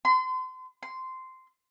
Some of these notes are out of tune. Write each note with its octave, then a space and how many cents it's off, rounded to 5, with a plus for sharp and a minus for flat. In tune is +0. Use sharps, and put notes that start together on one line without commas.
C6 -35
C6 -10